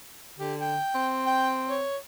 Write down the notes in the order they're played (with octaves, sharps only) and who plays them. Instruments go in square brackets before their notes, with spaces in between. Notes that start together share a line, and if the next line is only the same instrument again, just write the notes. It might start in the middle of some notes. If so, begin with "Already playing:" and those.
[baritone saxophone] D3 [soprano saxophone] G4
[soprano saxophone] G5
[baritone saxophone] C4
[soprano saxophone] G5
C#5